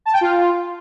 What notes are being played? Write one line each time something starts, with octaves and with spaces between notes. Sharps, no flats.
A5
G5
F4